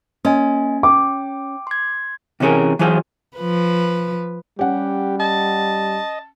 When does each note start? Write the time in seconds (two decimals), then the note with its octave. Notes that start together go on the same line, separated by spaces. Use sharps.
0.25 A#3 C#4 D#5 G#5
0.83 G5 D6
1.67 C6 G#6
2.40 C3 E3 C#4 G#4 A#4
2.79 E3 F#3 F4 G#4 B4 C5
3.37 F3 B4
4.59 G3 C#4 G4 F#5
5.20 D#5 A5